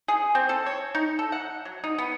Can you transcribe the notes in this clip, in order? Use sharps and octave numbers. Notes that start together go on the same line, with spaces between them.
G#4
C4
A4
C#5
D#4
A4
F#5
F#3
D#4
B3